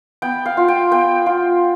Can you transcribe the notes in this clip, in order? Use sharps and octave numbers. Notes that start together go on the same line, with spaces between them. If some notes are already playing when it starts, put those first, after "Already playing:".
B3 G5
F5
F4
G5
B3 G5
F4